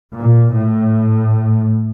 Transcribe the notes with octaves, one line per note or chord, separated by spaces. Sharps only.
A#2
A2